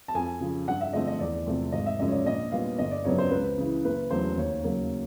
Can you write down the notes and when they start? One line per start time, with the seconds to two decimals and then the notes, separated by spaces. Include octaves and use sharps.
0.08 A5
0.15 F2 G#5
0.40 C#3 F3
0.68 G2 F#5
0.81 E5
0.93 D3 F3 A3 C4 D#5
1.07 D#5
1.20 E2 D5
1.46 C3 F3 A3 C4
1.72 G#1 D#5
1.86 E5
1.99 F#2 C#3 F3 G#3 D#5
2.08 C#5
2.12 D5
2.25 A#1 D#5
2.52 A#2 G3 B3 F5
2.78 G1 D#5
2.91 D5
3.04 F2 C#3 F#3 B3 C#5
3.18 C5
3.31 C#2 B4
3.58 C#3 E3
3.84 F#1 B4
4.10 E2 C#3 F#3 A3 C5
4.37 D#2 C#5
4.63 C#3 F#3 A#3